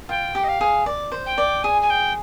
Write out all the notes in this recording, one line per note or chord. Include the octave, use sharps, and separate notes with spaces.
F4 G5
G4
D#5
F5
G#4
D5
C5
G5
D5
G#4 G#5
G#5
G5